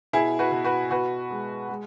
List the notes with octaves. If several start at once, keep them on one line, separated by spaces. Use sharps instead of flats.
B2 E4 G#4
F#4 B4
B2
F#4 B4
B2 F#4 B4
G#3
G#3